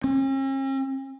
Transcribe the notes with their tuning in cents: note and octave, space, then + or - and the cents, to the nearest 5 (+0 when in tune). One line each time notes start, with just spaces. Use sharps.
C#4 -45